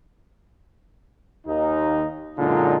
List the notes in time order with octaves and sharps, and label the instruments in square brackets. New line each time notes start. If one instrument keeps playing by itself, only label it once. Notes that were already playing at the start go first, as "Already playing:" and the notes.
[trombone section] D#2 D#4
F#2 A#2 D3 G#3 D#4 F4